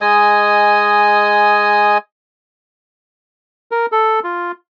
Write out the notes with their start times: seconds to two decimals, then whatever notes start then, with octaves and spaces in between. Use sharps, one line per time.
0.01 G#3 D#5 G#5 D#6
3.72 A#4
3.92 A4
4.24 F4